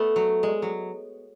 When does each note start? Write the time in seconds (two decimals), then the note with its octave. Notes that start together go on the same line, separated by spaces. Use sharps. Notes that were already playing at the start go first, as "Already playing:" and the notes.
Already playing: A3 B3
0.16 F#3
0.43 G#3
0.62 F#3